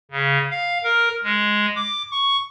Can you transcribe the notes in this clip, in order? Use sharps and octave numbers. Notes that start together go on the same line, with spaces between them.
C#3
F5
A#4
G#3
D6
C#6